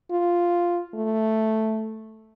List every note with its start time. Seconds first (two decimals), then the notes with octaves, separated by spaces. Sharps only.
0.11 F4
0.95 A3